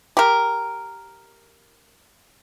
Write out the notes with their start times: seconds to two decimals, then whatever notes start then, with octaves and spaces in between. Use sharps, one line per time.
0.17 G4 A#4